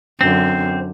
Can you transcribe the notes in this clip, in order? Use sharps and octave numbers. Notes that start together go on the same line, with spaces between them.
F#2 D3 C4